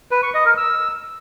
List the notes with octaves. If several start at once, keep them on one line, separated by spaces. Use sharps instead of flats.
B4
C#6
D#5
A#4
E6